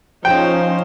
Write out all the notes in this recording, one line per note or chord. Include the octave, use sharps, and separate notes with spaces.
F3 C#4 D#4 C5 G5